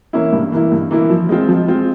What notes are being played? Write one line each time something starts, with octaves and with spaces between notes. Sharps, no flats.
E3 A#3 C#4 E4
G2
E3 A#3 E4
G2
E3 A#3 E4
F3
G#3 C4 F4
F3
G#3 C4 F4